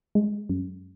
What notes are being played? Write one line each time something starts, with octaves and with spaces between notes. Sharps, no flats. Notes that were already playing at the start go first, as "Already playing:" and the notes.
G#3
F#2